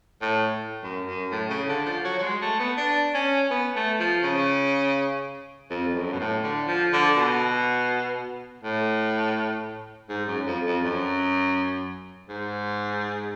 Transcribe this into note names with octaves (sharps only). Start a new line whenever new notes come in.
A2
F#2
F#2
A2
C#3
D3
F3
F#3
F#3
G#3
A3
B3
D4
C#4
B3
A3
F3
C#3
F2
F2
F#2
B2
A2
D3
F3
D3
B2
A2
G#2
F#2
F2
F2
F#2
G#2